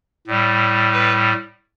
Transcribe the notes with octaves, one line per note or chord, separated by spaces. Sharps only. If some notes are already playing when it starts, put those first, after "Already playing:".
A2 G3
B4